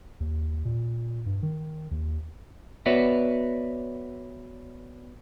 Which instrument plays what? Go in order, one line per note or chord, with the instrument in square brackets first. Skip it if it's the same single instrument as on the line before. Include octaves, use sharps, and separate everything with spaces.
[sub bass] D#2
A#2
G2
D#3
D#2
[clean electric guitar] B3 F#4 B4 C#5 D5 E5